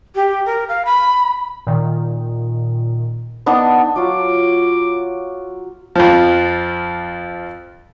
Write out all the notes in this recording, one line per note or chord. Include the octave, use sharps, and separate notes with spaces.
G4
A#4
F5
B5
A#2 D#3
B3 D4 D#4
F#3 F4 F#4 D6
F2 F3